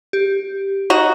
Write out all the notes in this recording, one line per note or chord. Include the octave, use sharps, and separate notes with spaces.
G4
D#4 F#4